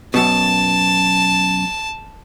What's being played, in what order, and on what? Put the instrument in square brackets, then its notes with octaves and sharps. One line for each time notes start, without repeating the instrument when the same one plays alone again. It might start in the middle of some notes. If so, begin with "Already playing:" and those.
[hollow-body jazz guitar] F#2 B2 [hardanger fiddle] A5